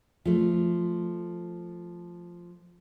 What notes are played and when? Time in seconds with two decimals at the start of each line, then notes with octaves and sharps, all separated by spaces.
0.25 F3 A3